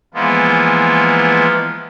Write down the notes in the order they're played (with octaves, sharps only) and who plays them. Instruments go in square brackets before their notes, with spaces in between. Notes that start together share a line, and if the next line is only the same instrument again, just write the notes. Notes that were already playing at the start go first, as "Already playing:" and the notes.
[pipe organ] E3 F3 G#3 A#3 B3 F4